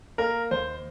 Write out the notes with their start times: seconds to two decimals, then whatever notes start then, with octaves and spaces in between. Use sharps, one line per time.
0.18 A#3 A#4
0.51 D#2 C5